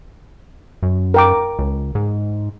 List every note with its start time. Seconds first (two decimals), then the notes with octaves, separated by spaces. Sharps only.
0.83 F#2
1.14 A#4 G5 D6
1.59 C#2
1.95 G#2